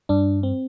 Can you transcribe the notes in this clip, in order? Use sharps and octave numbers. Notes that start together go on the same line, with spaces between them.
G2 D4
C4